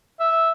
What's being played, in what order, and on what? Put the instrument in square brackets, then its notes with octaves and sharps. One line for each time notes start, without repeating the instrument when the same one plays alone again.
[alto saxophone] E5